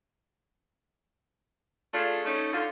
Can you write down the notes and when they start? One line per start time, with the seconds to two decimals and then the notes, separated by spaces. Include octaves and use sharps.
1.93 A3 D4 F4 G#4
2.25 A3 C#4 D#4
2.52 D3 F4